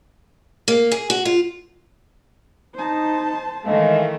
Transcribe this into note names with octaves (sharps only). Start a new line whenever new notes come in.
A#3
G#4
F#4
F4
D#4 C5 A5
D#3 E3 G#3 A3 F5